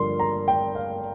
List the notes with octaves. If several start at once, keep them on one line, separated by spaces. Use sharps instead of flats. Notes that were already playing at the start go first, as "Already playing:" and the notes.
Already playing: G2 D3 F3 A#3 C6
A#5
G5
F5